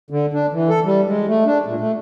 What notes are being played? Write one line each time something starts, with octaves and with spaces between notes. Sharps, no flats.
D3
D4
E3
A4
G3
G#3
A3
D4
A#2
A3